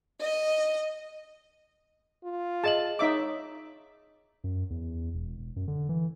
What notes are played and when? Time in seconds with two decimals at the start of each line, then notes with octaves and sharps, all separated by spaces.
0.20 D#5
2.24 F4
2.64 G#4 D#5 A5 F#7
2.99 D#4 C#5 E5 D6
4.44 F#2
4.70 E2
5.14 E1
5.38 E1
5.56 F#2
5.68 D3
5.89 E3